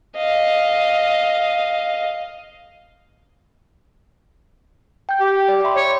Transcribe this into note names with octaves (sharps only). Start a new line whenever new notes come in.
D#5 F5
G5 G6
G4
D5
E5 B5 C6
C#5